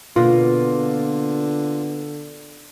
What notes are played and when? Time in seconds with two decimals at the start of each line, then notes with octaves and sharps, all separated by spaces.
0.16 B2 D3 A#3 B3 F4